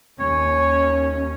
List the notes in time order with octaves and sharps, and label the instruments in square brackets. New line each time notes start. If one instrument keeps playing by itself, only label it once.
[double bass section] D#2 C#4 [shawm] C#5